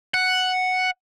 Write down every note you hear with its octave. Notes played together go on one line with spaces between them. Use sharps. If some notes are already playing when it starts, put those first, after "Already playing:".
F#5